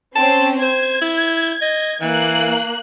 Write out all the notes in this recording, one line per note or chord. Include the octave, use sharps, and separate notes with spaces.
C4 C#4 A5
C5 G#6
E4
D#5
E3 A#3 F#6